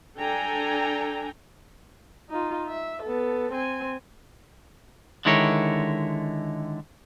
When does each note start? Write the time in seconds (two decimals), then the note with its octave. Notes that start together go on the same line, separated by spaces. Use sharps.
0.20 D4 A4 G5 G#5 A#5
2.29 D#4 F4
2.69 E5
3.02 B3 A4
3.52 C4 G#5
5.25 D3 D#3 G#3 E4 A#4 C#5